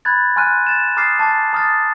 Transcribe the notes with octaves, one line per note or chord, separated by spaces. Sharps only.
B5 F#6 G#6 A6
G#5 C6 F6 F#6 D#7
A6 E7
A#5 D6 D#6 F6 A6 C7
A5 D6 A6
A#5 D#6 F6 A6